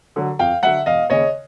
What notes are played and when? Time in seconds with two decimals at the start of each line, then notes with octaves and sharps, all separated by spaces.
0.16 D3 F#3
0.39 F2 F5 G5
0.63 D3 F#3 E5 F#5
0.86 E1 D#5 F5
1.10 D#2 C#3 C#5 D#5